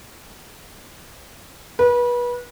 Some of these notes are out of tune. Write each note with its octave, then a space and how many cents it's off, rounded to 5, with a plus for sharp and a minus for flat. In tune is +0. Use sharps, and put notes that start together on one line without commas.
B4 -30